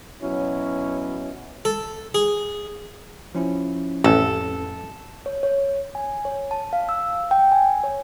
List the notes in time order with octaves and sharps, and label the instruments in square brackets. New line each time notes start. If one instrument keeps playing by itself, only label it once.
[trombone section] B2 F#3 C#4 E4
[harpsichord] A4
G#4
[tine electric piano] F3 C#4 E4
[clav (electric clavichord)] A1 [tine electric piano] F2 [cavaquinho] A4
[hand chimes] C#5
C#5
G#5
C#5
A5
F5
E6
G5
G#5
C#5